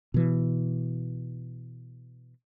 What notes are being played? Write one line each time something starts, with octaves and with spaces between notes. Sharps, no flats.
B2 E3